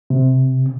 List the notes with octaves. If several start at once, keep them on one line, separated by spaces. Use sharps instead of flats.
C3